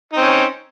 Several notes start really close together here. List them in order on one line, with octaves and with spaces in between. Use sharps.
D#4 C4 C#4